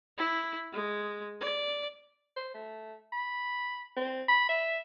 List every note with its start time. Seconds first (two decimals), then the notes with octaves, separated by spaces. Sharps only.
0.18 E4
0.73 G#3
1.41 D5
2.36 C5
2.54 A3
3.13 B5
3.96 C4
4.28 B5
4.49 E5